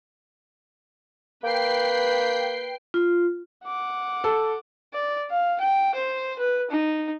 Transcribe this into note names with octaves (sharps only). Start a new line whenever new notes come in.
A#3 B4 G5 C7
F4
F#5 D6
A4
D5
F5
G5
C5
B4
D#4